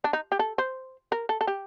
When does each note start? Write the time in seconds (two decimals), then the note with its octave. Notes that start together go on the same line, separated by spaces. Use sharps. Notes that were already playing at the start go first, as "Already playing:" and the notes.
0.04 D4
0.13 D#4
0.32 G4
0.39 A4
0.58 C5
1.12 A#4
1.29 A4
1.41 A4
1.47 G4